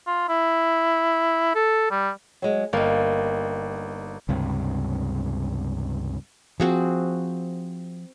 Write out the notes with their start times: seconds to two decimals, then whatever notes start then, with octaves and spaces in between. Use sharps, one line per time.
0.07 F4
0.29 E4
1.55 A4
1.91 G3
2.42 F#3 G#3
2.73 G1 G3 A#3 D#4
4.29 C#2 G2 C3
6.60 F3 C4 F#4 G#4